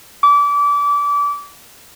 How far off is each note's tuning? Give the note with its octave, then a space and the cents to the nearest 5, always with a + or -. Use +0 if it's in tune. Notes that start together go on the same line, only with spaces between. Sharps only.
D6 -30